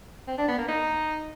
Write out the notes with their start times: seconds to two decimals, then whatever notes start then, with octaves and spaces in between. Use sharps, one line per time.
0.28 C4
0.38 D4
0.48 B3
0.58 A#3
0.68 D#4